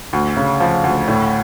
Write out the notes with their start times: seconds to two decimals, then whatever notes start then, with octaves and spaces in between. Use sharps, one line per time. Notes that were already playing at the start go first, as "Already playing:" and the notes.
0.13 D2
0.37 C#3
0.60 F3
0.84 D2
1.08 A2